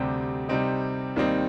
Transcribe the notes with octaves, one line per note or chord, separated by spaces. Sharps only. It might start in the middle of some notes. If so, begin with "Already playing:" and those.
Already playing: D2 C3 G3 C4 G4
C3 G3 C4 D#4
D#2 D#3 G3 C4 D#4